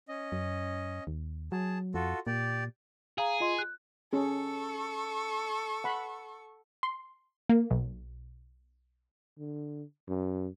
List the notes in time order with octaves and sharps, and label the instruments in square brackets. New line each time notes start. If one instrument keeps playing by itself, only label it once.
[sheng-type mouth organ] C#4 D#5
[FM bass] F#2
D#2
[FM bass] F#3 [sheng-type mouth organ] G#4 A5
[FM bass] F2 [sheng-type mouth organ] F4 F#4 A4
[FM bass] A#2 [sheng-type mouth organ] G4 D5
[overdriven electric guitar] G#4 [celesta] F5 A#5
[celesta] F4 D#5 C6
F#6
[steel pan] C#4 G#4 [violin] A4 C#6
[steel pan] F#5 B5
[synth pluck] C6
A#3
B1
[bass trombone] D3
F#2